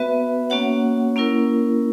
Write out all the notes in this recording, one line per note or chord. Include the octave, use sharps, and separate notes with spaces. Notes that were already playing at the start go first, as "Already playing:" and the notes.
Already playing: B3 F#4 B4 E5
A#3 C#4 F#4 C#5 F#5
A#3 C#4 E4 A#4